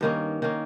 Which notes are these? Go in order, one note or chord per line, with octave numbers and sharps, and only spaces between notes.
G2 D#3 A#3 C#4
D#3 A#3 C#4